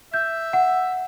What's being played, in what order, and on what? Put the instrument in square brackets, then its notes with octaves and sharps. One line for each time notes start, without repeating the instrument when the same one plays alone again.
[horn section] E5 [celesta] G6
[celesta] F#5